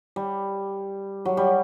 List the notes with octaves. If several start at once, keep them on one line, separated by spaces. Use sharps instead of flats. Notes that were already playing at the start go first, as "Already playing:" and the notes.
G3
F#3
G3